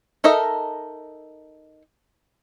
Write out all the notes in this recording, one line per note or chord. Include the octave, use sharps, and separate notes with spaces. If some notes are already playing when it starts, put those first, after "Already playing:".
D#4 A4 A#4 D#5 E5